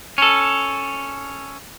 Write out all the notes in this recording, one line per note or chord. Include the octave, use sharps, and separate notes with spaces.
C#4 A4